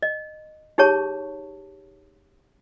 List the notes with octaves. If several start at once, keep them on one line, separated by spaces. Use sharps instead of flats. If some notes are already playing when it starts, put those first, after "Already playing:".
D#5
D#4 G4 G#4 C#5 A5 C#6